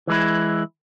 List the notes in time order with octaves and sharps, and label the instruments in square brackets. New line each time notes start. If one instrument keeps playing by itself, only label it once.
[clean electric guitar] E3 G#3 E4